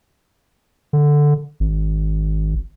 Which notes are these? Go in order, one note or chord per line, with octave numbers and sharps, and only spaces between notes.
D3
G#1